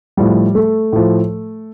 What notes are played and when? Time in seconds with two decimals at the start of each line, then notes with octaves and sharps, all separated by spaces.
0.17 A2 F3 G3
0.55 A3
0.93 A2 F3